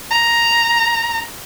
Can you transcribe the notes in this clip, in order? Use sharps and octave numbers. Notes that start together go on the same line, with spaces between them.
A#5